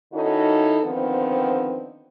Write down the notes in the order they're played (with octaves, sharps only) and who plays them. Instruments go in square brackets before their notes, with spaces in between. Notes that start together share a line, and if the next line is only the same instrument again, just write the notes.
[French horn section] D#3 C#4 D#4 E4 F#4 A4
D3 D#3 F3 B3 C4